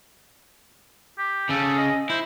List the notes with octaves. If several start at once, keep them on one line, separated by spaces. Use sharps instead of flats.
G4
C#3 A4
D#5
E4 C5